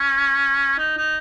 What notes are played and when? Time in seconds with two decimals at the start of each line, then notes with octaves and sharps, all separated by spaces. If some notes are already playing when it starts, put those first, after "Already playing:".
Already playing: C#4
0.78 D#4
0.97 D#4